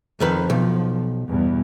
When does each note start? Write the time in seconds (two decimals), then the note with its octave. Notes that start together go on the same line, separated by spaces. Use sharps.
0.20 F2 D#3 F3 B4
0.50 B1
1.29 E2 G2 B2